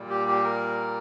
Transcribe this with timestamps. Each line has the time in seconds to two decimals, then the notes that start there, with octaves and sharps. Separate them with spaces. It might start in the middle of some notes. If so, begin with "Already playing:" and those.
Already playing: A#2 G3
0.10 G4
0.27 G4
0.44 A#4